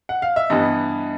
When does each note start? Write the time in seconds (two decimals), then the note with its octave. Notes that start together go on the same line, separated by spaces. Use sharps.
0.09 F#5
0.22 F5
0.36 E5
0.50 G2 E3 G3 B3 D#5